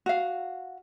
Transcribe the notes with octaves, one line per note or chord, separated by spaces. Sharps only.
F#4 F5